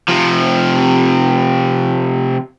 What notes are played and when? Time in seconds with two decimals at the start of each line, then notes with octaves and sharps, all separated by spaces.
0.09 C3 F3